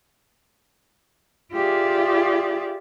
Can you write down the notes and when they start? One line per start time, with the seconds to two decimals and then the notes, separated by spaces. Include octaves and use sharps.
1.53 F4 G4 G#4 D5 E5